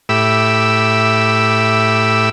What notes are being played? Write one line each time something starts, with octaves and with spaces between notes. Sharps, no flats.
A2 G4 E5 B5 D6 E6